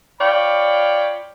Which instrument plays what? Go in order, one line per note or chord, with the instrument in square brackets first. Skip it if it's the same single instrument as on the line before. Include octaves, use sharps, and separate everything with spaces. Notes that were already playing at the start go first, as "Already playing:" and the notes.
[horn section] F4 C#5 D5 G5 B5